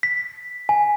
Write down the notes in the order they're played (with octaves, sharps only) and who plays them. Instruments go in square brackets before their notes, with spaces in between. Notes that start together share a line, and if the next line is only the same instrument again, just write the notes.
[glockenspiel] B6
G#5